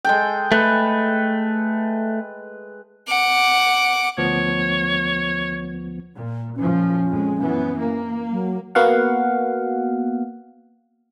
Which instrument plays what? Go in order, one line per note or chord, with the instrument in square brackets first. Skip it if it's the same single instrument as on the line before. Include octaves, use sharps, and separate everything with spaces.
[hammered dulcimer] G#3 A4 G5
[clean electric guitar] A3 [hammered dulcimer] B4
[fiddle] F#5 D6
[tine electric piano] D2 F3 B3 [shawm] C#5
[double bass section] A#2
[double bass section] F#1 A#2 F3 [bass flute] C#4
[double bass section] F2 G#3
F#2 E3 B3
A#3
[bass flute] F#3
[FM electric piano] A#3 B3 F#4 F5 F#5